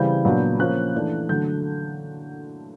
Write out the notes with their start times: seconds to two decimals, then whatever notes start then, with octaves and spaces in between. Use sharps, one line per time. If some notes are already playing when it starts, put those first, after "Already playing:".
Already playing: C#3 E3 G3 C4 G6
0.25 A#2 F#3 B3 D4
0.59 F3 A#3 C#4 F#6
0.94 E3 A3 D4
1.29 D3 F#3 A3 G6